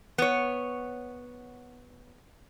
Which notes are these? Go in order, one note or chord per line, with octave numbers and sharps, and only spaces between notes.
B3 C#5